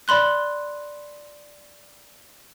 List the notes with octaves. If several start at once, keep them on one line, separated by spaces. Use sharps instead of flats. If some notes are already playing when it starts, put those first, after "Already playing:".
D5 B5 C6 F#6